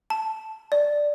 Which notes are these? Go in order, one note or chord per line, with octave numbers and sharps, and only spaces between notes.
A5
D5